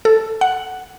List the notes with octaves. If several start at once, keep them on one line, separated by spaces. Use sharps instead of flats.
A4
F#5